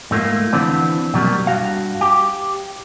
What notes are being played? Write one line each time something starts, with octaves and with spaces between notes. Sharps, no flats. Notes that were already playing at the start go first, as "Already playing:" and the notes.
G#2 A3 A#3 F4
D3 E3 B3 C4 D4
B2 F#3 G3 A#3
G2 F#4 F5
G4